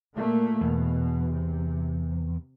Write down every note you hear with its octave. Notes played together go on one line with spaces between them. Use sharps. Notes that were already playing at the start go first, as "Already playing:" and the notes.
A#2 A3 A#3
E2 B2
C3